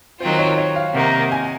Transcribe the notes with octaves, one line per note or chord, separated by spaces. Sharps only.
D#3 F#3 C4 F4 C5
C#5
C#5
F5
C3 D#3 A#3 F#5
G#5